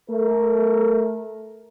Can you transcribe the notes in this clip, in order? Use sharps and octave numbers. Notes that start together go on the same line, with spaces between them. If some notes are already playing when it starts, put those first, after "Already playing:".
A3 A#4